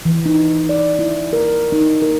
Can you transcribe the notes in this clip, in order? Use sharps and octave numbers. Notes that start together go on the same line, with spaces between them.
E3
D#4
D5
E4
A#4
D#4
A#4